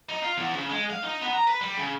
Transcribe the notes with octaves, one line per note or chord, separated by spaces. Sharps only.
D#4
F4
E2
C#3
G#3
F5
D#4
B3
A#5
B4
G3
C#3